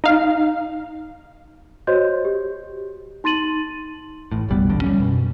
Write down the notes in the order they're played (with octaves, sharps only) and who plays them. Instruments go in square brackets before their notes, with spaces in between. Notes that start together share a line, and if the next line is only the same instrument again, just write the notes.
[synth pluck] D#4 F5
[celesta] F#4 C5 C#5 D#5 C6 G6
G4
D#4 C6 A6 D#7 F#7
[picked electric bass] A1 A2
F#1 B1 G3 B3
D#1 A1 F2 D3
G3 A3 C#4
F#2 B2